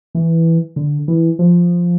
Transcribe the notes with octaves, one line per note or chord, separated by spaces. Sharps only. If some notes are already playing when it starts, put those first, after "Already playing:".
E3
D3
E3
F3